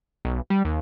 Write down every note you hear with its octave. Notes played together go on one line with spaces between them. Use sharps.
B1
G3
D#2